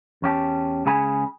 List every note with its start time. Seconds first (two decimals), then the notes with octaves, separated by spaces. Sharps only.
0.22 E2 C#4 G4 A5
0.85 C#2 C#3 G#4 G#5 B5